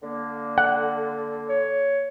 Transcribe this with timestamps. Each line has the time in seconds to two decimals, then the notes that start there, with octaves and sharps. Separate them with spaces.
0.03 D3 A#3
0.58 F#5
1.49 C#5